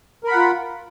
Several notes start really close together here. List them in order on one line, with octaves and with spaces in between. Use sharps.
A#4 B5 F#5 F4